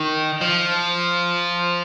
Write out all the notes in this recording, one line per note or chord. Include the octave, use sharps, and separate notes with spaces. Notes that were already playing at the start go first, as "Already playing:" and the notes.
Already playing: D#3
F3